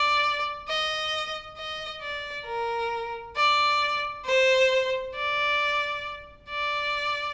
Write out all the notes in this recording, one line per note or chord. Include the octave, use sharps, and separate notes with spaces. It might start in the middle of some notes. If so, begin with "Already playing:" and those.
Already playing: D5
D#5
D#5
D5
A#4
D5
C5
D5
D5